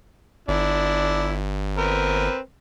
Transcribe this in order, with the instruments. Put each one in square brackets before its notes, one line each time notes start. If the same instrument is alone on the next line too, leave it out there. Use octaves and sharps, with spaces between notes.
[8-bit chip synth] G1 [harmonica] D4 E4
[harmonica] C4 A#4 B4